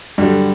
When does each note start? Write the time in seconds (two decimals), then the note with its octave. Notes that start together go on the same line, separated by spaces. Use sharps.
0.18 G2 D3 F#3 G3